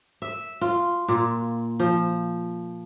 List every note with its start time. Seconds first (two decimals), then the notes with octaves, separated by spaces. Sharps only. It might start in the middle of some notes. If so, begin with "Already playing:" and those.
0.22 E5
0.61 F4
1.08 A#2
1.80 F3